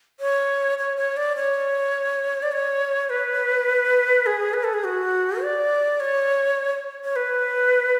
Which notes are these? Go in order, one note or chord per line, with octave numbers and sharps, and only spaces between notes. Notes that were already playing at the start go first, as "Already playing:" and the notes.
C#5
C#5
C#5
D5
C#5
D5
C#5
B4
G#4
B4
A4
G#4
F#4
D5
C#5
C#5
B4